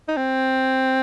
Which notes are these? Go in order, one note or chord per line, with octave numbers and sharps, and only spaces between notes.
D#4
C4